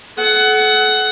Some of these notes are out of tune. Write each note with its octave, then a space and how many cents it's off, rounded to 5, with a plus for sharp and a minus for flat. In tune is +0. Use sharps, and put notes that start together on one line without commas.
A4 -40 F#5 +15